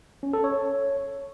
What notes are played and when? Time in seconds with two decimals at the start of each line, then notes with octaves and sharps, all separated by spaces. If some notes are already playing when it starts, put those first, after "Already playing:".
0.23 C#4
0.33 A4
0.44 C#5